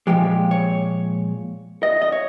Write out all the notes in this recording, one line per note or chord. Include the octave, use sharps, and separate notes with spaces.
A#2 F3 G#3 G4
C#5
D#5
D#5
C#5